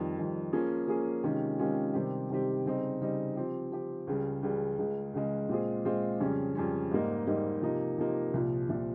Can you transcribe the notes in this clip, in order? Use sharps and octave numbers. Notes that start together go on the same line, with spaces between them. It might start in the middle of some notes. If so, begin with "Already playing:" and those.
Already playing: F2 D#3 G3
F2 D#3 G3
F3 A#3 C#4 G#4
F3 A#3 C#4 G#4
C3 D#3 G#3 C#4 F4
C3 D#3 G#3 C#4 F4
C3 D#3 G3 C4 G4
C3 D#3 G3 C4 G4
C#3 G3 C4 D#4
C#3 G3 C4 D#4
F3 C4 G4
F3 C4 G4
C#2 C#3 G3
C#2 C#3 G3
C#2 C#3 G#3
C#2 C#3 G#3
A#2 G#3 C4 F4 G#4
A#2 G#3 C4 F4 G#4
F2 C#3 G3 C#4
F2 C#3 G3 C#4
G#2 G3 A#3 D#4
G#2 G3 A#3 D#4
C3 F3 A#3 D#4
C3 F3 A#3 D#4
C2 A#2 F3
C2 A#2 F3